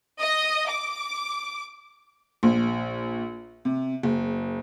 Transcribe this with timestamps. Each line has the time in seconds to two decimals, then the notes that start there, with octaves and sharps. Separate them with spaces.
0.20 D#5
0.70 D6
2.43 A#1
3.65 C3
4.03 F#1